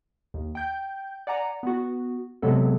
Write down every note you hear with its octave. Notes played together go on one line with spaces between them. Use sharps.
D#2
G5 G6
D5 F#5 G#5 A#5
B3 F#4
C3 F#3 G#3 B3 C4 A4